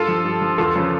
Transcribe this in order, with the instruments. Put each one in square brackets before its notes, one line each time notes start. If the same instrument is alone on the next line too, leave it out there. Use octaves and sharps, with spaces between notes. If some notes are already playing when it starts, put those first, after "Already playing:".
Already playing: [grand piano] G2 F4 A4
F3
G2
F3
E2 F4 A4
C#3 F3